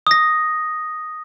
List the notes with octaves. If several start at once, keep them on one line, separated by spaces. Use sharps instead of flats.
D#6 A#6